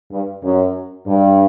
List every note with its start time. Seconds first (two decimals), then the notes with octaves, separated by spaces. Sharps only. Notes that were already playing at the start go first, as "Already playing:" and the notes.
0.11 G2
0.43 F#2
1.07 G2